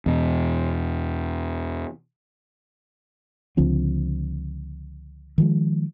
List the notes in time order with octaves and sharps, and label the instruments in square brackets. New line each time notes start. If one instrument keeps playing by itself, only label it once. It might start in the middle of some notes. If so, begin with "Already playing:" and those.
[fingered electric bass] E2 B2
C#2 D3 F3 C4
D#3 F3 G#3